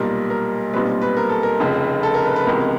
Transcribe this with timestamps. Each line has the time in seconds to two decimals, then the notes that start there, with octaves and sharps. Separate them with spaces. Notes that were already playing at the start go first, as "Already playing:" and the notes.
Already playing: B1 A#2 G3 A#4
0.30 A#4
0.73 B1 A#2 G3 C4 B4
1.02 B4
1.17 A#4
1.30 A4
1.43 A#4
1.60 F1 F2 C#3
2.03 A4
2.14 A#4
2.25 B4
2.36 B4
2.47 C#2 C3 E3 G#3 B3 A#4